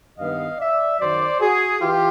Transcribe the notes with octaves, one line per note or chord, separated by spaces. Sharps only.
G2 D#3 G3 B3 D#5 F5
D5 E5
F#2 D#3 F#3 C5 D5
F#4 G#4
E3 F4 G4